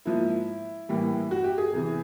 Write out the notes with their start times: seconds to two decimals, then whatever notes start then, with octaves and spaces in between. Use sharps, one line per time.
0.05 G#2 F3 A#3 E4
0.89 A2 E3 G3 A#3
1.31 F#4
1.44 G4
1.58 G#4
1.73 E2 C3 E3